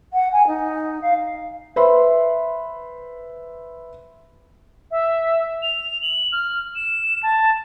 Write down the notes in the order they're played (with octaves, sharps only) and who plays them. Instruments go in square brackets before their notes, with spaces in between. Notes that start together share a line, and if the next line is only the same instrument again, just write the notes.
[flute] F#5
G#5
D#4
F5
[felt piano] B4 C5 E5 B5 C6
[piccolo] E5
F7
F#7
F6
E7
A5